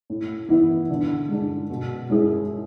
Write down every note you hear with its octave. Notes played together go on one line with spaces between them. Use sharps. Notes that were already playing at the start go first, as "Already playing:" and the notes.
A2
E3 B3 E4
D3
G#3 D4
B2
G#3 C#4 E4 G#4